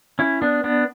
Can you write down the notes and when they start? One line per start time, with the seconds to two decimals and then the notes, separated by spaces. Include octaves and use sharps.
0.19 C#4 E4
0.42 B3 D4
0.64 B3 D4